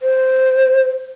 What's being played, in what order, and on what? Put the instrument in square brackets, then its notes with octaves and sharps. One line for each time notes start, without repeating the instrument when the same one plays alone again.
[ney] C5